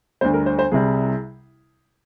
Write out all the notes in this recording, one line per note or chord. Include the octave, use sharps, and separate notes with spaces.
D2 D3 G3 C5
A#4
C5
C5
C2 C3 G3 G#4